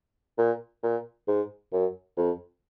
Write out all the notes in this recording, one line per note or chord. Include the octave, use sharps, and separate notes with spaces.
A#2
A#2
G#2
F#2
F2